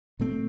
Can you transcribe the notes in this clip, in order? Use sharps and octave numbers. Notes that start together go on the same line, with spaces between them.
A#2 A3 C4